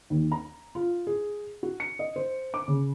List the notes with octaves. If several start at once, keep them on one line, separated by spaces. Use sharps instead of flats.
D#2
A#5
F4
G#4
F#4
C#7
D#5
C5
D6
C#3